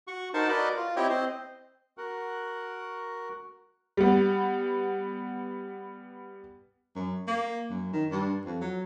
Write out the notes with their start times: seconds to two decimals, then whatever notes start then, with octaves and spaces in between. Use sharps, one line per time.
0.08 F#4 C#6
0.34 D#4 F#4 A#4 C5 F#5 A5
0.49 F#4 A#4 B4 D5 D#5
0.76 F4
0.96 C4 E4 G4 C#5 D#5 G5
1.09 C4 C5 D#5
1.97 F#4 A#4 F#5
3.97 G3 B3
6.95 F#2
7.27 A#3
7.70 F#2
7.93 D#3
8.11 G2
8.45 F2
8.61 F#3